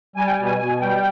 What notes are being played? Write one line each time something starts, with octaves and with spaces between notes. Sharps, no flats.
G3 G#5
G5
G#5
B2
G#5
B2 G#5
G3 G5